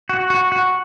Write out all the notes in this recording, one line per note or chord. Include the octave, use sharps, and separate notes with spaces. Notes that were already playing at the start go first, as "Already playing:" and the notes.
F#4
F#4
F#4